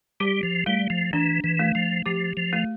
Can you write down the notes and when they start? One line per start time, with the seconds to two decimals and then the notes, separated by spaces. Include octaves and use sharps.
0.20 G3 G4
0.43 F3
0.66 G3 A3
0.90 F3
1.13 E3 D4
1.44 E3
1.59 A3
1.75 F3
2.06 F3 G4
2.37 F3
2.53 A3